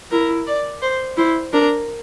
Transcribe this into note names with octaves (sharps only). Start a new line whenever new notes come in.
E4 A#4
D5
C5
E4 C5
D4 A#4